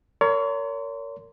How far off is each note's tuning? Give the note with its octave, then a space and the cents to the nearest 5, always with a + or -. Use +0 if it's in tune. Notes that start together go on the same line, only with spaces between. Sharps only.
A#4 -20 C#5 +35 C6 -15